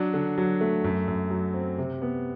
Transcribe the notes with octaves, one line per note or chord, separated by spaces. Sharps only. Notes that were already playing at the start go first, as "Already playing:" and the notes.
Already playing: F#3 D4
D3
F#3
A3
F#2
F#2
F#3
C4
C3
B3